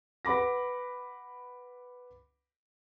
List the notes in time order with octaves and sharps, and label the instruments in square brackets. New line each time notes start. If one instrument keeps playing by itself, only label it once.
[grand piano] B4 F#5 B5 D6 A#6